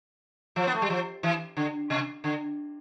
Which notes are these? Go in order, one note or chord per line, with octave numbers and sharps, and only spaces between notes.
F3
B3
A3
G3
F3
E3
D3
C3
D3